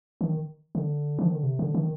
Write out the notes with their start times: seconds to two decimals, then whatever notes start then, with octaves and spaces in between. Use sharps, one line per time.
0.21 D#3
0.75 D3
1.19 F3
1.27 D#3
1.35 D3
1.43 C3
1.59 D3
1.75 D#3